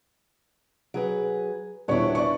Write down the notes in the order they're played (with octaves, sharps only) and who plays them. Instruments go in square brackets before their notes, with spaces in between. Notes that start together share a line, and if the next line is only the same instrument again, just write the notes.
[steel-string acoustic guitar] F#3 G#4 B4
[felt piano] D#1 C#5 C#6 [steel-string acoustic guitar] B3 D4 E4
[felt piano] D5 C#6